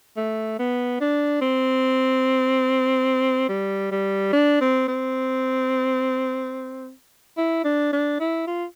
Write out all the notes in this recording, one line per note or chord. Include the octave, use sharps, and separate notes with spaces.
A3
B3
D4
C4
G3
G3
D4
C4
C4
E4
D4
D4
E4
F4